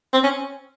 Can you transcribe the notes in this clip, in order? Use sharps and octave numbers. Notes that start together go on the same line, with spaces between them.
C4
C#4